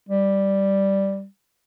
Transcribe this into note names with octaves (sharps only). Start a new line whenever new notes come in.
G3